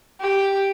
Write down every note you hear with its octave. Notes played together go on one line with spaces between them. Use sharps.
G4